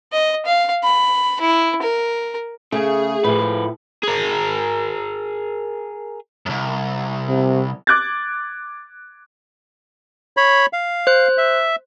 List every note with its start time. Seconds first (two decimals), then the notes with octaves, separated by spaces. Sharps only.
0.12 D#5
0.46 F5
0.84 B5
1.41 E4
1.82 A#4
2.72 C#3 A3 G#4
3.24 A2 F3 B4
4.03 G#4 A#4
6.46 C2 F#2
7.29 C3
7.87 D6 F#6 G#6 A6
10.37 C#5 B5
10.73 F5
11.07 C5 F#6
11.38 E5